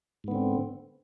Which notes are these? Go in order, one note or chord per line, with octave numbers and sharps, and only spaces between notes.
G#2 D3 B3 C4